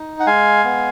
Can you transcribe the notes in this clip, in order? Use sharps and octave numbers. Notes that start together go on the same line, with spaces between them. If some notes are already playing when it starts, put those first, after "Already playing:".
Already playing: D#4
F#5
G#3 F5 G#5
B3